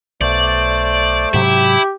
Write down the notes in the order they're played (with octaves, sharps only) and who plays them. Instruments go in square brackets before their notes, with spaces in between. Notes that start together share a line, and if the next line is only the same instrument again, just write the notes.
[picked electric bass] B1 [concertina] A3 C5 [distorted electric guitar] D5
[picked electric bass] G#2 C3 F#3 [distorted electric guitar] E4 [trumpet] G4